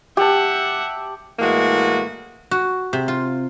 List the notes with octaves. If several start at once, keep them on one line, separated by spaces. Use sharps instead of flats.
G4 E5 F#5 A5
A2 E3 G#3 A#3 F#4
F#4
C3
F4